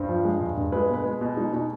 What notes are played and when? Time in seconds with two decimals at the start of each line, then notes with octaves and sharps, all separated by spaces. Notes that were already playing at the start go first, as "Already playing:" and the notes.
Already playing: G2 C5
0.09 F3
0.25 G#3
0.40 G2
0.57 G2
0.72 G#3 B4
0.90 B2 B4
1.05 G#3
1.21 B2
1.37 G#3 D#4
1.53 B2 D#4